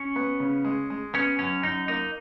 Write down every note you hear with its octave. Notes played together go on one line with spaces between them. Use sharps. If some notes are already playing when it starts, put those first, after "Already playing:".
Already playing: C#4
B3
C#3
G#3
G#3
B3 C#4
F#2 C#4
F#2 D#4
A#3 D#4